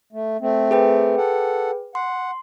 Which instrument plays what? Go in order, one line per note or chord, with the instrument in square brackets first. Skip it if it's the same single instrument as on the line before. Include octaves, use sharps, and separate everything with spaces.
[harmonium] A3
A3 C4
[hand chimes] G#4 B4 G5
[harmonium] A4 F#5
[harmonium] F#5 [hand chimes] C6